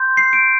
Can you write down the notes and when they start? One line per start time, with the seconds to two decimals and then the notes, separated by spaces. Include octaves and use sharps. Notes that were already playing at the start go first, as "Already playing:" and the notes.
Already playing: C6 G6
0.17 C7
0.33 D7